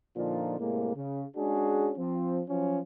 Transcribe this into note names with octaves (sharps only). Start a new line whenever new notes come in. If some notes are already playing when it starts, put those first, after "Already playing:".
A#2 D3 F3 D4 D#4 F4
A2 C3 G#3 A#3
C#3
G#3 C#4 D4 F#4 G#4
F3 C4
F3 F#3 C#4